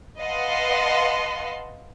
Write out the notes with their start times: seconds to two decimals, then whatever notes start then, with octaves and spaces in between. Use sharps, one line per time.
0.20 B4 D#5 F5 F#5 A5 C6